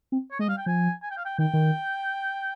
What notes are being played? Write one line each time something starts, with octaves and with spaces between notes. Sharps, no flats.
C4
C#5
G#3 D#5
G3 F5
G5
F3 G#5
G#5
G5
F5
G5
D#3 G5
D#3